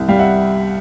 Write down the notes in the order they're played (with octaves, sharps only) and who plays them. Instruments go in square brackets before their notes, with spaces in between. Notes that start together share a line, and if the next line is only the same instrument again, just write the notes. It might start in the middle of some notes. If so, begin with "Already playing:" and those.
Already playing: [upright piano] C2
G3 F5 G5
E5 F#5